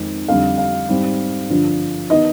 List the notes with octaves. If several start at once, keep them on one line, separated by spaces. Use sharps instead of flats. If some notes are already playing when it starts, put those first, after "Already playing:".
Already playing: F2 D#3 G#3 C4 D#4
F2 D3 G3 D4 F5
F5
G#2 G3 C4
G2 D3 F3
D#3 B3 D#4 D#5